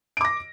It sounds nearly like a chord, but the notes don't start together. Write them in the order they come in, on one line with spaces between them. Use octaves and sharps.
D7 D6 A#6